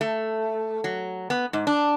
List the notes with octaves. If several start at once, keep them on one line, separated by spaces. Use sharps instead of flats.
A3
F#3
B3
G#2
D4